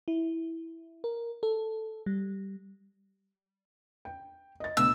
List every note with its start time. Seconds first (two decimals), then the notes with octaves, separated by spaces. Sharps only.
0.08 E4
1.04 A#4
1.43 A4
2.06 G3
4.05 G5
4.60 D#5 A6
4.77 D2 B2 E6